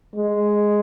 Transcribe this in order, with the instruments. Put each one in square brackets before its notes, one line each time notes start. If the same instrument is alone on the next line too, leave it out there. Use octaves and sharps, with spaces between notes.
[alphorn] G#3